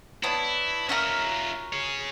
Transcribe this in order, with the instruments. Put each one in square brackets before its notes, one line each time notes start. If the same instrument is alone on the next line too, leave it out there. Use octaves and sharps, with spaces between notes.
[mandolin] B3 D4 C#5 [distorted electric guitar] E4
[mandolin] C#4 F#4 A#4 [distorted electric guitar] F4 E5
[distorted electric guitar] G#4 C#5